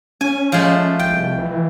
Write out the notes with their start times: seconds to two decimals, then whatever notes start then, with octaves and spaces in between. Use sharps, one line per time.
0.21 C#4 G#5
0.52 F3 G#3 A3
0.99 G#1 G5
1.11 C2
1.38 E3